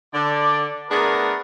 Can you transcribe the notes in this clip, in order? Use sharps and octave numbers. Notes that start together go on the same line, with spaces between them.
D3 D5
A3 B3 D4 G#4 A#4